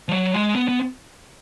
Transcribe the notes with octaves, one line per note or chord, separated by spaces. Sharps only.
F3
F#3
G#3
B3
B3